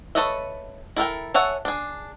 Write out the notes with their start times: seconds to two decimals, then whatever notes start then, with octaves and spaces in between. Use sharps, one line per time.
0.15 A4 B4 C#5 D#5 E5
0.96 E4 A4 A#4 G5
1.34 A4 C#5 E5 F#5 G#5
1.65 D4 G#4